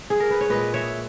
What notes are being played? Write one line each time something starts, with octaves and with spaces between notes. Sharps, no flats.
G#4
A#4
B4
C#5
A#2 G#3 B4 D#5
C#5 E5